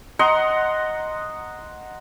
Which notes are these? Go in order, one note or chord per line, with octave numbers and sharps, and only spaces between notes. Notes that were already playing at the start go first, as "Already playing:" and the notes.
D#5 F#5 A#5 C6